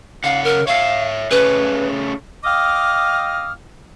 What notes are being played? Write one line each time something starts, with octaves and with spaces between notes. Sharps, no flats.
C#3 F5 F#5
A#4
C#5 E5 F5
A3 C#4 G#4 B4
D#5 F5 G5 D6 D#6 F6